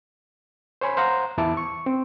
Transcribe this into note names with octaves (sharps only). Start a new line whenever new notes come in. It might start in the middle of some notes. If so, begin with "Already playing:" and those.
C5 C#5 G#5 B5
C5 F5 F#5 A#5
E2 E4 A5 D6
C#6
C4